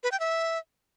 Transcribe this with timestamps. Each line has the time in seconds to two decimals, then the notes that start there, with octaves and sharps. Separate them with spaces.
0.03 B4
0.12 G5
0.20 E5